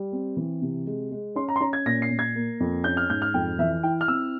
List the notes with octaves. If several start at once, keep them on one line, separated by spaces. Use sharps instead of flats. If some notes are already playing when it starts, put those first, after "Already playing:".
Already playing: G3
C4
E3
C3
G#3
G#3
C#4 C6
A#5
C6
C#4 A#5
G#6
A#2 A#6
C7
A#2
G#6
A#3
F2
C#4 G6
F6
G#2 G6
F6
F2 G5
E3 E5
E4 G5
F6
C4 E6